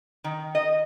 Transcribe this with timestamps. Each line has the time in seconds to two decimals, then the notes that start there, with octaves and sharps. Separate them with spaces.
0.24 D#3
0.55 D#5